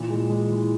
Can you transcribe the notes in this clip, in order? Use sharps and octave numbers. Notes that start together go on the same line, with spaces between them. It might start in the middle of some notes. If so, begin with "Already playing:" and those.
Already playing: A#2 E3
G#3
G#3
E3